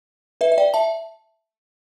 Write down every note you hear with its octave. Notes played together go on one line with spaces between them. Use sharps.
B4 E5
E5
D5 G5
E5 A5